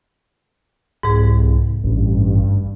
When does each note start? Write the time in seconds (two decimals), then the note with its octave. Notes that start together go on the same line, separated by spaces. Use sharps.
1.03 C2 G#2 G#4
1.84 A1 G2